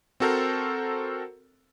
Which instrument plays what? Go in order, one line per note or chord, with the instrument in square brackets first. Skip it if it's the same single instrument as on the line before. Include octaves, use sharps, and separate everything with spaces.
[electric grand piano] C4 F#4 A4 A#4 C5